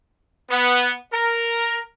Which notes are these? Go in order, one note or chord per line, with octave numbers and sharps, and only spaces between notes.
B3
A#4